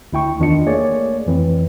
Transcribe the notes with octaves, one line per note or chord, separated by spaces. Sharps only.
D2 E4 G5 C#6
E2 D#3 D4 F4 D#5 C#7
A3 A#3 G#4 C#5 D5
F2 E3 C4